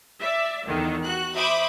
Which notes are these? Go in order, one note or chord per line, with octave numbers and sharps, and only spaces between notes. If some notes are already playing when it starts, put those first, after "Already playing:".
D5 E5
E2 D3 D#3
F#4 F#6
C5 E5 B5 D6 D#6